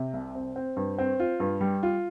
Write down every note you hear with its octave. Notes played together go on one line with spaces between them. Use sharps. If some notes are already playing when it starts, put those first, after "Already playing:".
Already playing: C3
C2
C4
C4
G2
C4
F4
G2
G3
F4